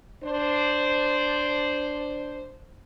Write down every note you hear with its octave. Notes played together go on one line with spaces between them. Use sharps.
D4 C5